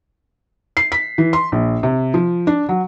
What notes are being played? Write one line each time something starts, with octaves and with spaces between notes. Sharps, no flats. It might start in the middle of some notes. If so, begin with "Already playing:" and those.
C7
B6
E3
C6
A#1
C3
F3
D4
F#3